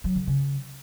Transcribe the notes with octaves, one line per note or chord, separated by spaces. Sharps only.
F#3
D3
C#3